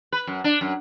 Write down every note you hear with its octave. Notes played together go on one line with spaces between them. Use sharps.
B4
F#2
D4
F#2